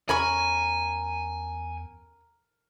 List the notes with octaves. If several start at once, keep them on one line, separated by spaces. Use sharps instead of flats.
E2 C#4 A#4 G#5 B5 C#6